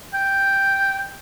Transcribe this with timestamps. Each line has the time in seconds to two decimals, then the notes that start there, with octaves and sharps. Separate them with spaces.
0.14 G5